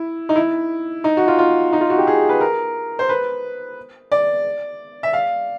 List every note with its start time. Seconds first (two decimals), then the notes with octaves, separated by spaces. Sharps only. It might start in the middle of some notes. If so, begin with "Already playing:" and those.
Already playing: E4
0.29 D#4
0.36 E4
1.04 D#4
1.17 F#4
1.28 F4
1.39 F4
1.73 D#4
1.81 F4
1.90 F#4
1.98 G4
2.07 G#4
2.29 B4
2.41 A#4
2.99 C5
3.09 B4
4.12 D5
5.03 E5
5.13 F5